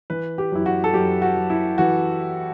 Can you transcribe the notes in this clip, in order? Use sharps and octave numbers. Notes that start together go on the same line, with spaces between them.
E3 B4
G4
F#2 E4
F#4
A4
F#2 G4
F#4
F#2
E4
E3 F#4